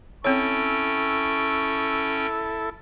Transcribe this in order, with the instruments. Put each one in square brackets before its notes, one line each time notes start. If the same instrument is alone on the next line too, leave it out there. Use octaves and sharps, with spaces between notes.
[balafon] C4 C#5 [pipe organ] C#4 G5 [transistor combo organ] E4 A4 [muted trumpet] C#6